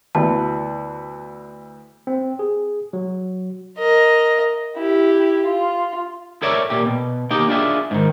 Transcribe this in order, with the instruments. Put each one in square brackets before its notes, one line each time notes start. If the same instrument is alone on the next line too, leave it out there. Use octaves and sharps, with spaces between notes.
[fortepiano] D2 E3 B3 [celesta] A5
[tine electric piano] C4
G#4
F#3
[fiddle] A#4 D#5
E4 G4
F4
[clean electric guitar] A4 A#4 C#5 D5 E5
A#2 G4
B2
A#3 D#4 G4 G5
D4 F4 G#4 E5
G#2 D#3